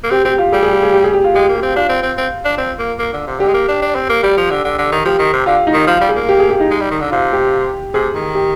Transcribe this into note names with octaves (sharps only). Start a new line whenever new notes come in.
A#3
C4 G4
C4 G4
F4
G3 G#4
G#4
G4
G#4
G4
G#4
G4
F4
G#3 G4
A#3
G4
C4
D4 F4
C4
C4
C4
D4
C4
A#3
A#3
D3
C3
D3 G4
G#3
A#3
D4
D4
C4
A#3
G3 G4
F3
D3
D3
D3
D#3
F3 G4
D#3
C3
D3 F4
D#4
D#3
F3 F4
G3
G#4
A#3
G4
G#4
G4
D#4
G#3
G3
D#3
D3
C3 F4
G4
C3 G#4
D#3
G4